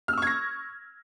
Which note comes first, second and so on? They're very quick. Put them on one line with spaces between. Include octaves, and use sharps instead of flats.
F6 E6 C#6 G#6 A#6